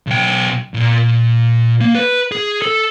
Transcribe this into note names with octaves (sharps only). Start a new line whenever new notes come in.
B1 G5
A#2 F4
A#3
B4
G#4
A4